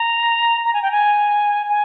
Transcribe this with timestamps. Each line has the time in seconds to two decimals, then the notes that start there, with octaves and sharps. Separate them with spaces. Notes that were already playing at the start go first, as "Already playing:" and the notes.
Already playing: A#5
0.65 A#5
0.74 G#5
0.83 G5
0.92 G#5
1.69 G#5